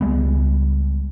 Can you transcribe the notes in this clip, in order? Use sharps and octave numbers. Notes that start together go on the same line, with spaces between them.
C#2 G3 G#3 B3